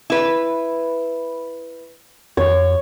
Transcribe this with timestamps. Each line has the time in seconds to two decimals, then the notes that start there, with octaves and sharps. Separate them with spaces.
0.10 E4 B4
2.37 F2 C#5